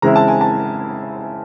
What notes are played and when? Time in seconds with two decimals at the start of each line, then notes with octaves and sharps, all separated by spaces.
0.02 C#3 E3 G#3 C4 E4 A#5
0.15 A5
0.28 G#5
0.41 A5